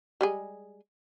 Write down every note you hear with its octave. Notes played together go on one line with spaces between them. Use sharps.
G3 G#3 G#4